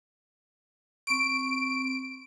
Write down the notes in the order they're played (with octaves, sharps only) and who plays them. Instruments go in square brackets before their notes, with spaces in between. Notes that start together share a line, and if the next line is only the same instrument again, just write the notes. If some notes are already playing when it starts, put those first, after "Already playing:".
[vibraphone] C4 C#6 [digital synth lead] D7